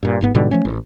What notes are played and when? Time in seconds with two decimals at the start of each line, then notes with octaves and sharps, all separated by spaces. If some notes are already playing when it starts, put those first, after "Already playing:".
0.03 G2 A#2
0.21 G1 G#2 B3
0.34 G#2 B2 D3 G3
0.51 F3 A3 C#4
0.65 A1